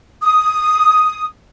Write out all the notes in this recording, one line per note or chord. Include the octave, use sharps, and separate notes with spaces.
D#6